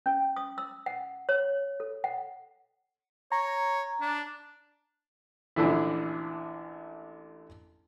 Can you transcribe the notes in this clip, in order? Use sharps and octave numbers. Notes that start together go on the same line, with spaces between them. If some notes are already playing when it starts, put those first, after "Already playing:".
C#4
D#6
E6
F#5
C#5
A4
F#5
C#5 A#5
D4
A1 A#2 D3 E3 F3 E4